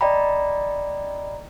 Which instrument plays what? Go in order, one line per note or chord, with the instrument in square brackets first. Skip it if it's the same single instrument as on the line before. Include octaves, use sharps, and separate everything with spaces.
[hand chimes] D5 D#5 G5 A#5 B5